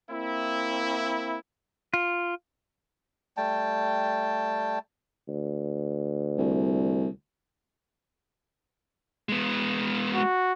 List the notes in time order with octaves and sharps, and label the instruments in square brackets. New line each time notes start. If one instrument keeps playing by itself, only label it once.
[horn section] A#3 C4 E4
[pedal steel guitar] F4
[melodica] G3 A3 G5 A5
[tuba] D2
[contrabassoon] C2
[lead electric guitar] G#3 B3
[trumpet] F#4